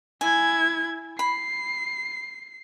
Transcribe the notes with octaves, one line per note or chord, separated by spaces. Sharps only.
E4 G#5 G#6
B5 C7